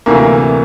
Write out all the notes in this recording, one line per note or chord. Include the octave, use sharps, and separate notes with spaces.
D2 C3 E3 A#3